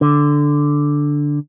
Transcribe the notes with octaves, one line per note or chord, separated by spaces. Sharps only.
D3